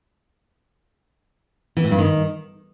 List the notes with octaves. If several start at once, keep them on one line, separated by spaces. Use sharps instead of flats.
E3
A2
G2
D#3